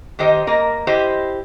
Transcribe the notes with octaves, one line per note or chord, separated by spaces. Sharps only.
D#3 D#4 G4 C5 D#5
A#3 A#4 D#5
E4 G4 C5 D#5